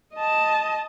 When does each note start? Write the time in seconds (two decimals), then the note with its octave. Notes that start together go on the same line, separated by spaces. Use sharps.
0.15 D#5 A5